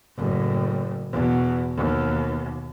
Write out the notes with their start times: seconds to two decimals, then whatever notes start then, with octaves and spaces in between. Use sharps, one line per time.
0.16 F#1 A2
1.11 E2 B2
1.75 D#2 B2